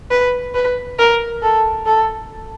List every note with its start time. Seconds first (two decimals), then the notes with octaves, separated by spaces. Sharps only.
0.11 B4
0.54 B4
0.98 A#4
1.42 A4
1.86 A4